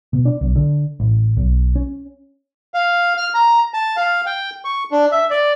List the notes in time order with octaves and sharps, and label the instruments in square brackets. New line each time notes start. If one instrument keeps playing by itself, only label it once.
[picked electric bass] B2
D4
B1
D3
A1
B1
C#4
[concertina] F5
F6
A#5
A5
F5
G5
C#6
D4
E5
D5